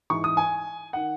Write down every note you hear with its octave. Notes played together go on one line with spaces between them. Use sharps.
G#2 E3 C#6
D#6
G#5
D#3 F#5